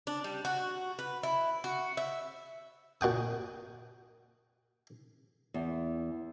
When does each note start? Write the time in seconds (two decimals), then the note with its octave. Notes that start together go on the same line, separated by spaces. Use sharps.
0.07 D4
0.24 G3
0.45 F#4
0.99 B4
1.23 E4
1.64 F#4
1.97 E5
3.01 A#2 F#4 G5 D#6
5.54 E2